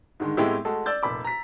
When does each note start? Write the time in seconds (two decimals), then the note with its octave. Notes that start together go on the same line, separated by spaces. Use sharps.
0.20 G#2 D3 D#3 G#3
0.37 A2 G#3 B3 C4 E4 G4
0.65 G#3 A3 F#4 G#4 A4
0.86 D5 E6 G6 A6
1.03 F1 A#2 B5 D6
1.25 A#5 B6